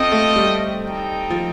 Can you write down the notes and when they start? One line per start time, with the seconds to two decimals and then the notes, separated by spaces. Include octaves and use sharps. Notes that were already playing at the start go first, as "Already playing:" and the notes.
Already playing: C4 F4 A4 D#5 G5
0.12 A3
0.36 G3
0.82 C4 D#4 A4 D#5 G5
1.30 F3